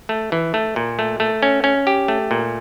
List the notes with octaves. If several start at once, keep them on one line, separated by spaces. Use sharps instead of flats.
A3
E3
A3
A#2
A3
A3
C#4
C#4
G4
A3
A#2